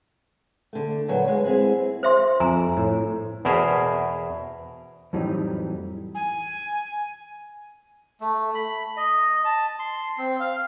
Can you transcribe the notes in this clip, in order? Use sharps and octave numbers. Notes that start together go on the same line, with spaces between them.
D3 A3
A#2 D3 F#3 B3
D#2 G#3
G#3 C4 E4 G#4
C5 E5 C6
F2 G#5 A#5
A2
E2 B2 G#4 A#4 C5 E5
F2 A2 E3 F#3 G3 D#4
G#5
A3
B5
D#5
A5
C6
C4
F5